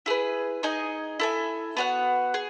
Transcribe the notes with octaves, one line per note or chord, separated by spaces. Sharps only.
E4 G#4 B4
D#4 G#4 D#5 G#5
E4 A4 E5 G#5
B3 F#4 C#5 F#5
G#4